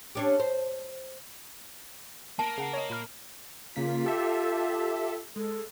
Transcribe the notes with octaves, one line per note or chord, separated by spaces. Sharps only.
C#4 D4 G4
C5
A#3 A5
C#3 F#5 C7
C#5 D#5
A#2 B5 F6
C#3 A#3 F4 B6
G4 A4 E5
G#3 A4